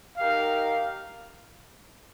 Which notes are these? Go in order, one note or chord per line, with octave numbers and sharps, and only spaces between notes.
D#4 G4 A#4 F5